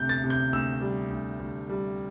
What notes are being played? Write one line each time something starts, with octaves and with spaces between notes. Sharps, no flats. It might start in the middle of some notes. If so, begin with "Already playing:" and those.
Already playing: D2 C3 G6
A6
C3
G6
D2 E6
G3
D2
D2
G3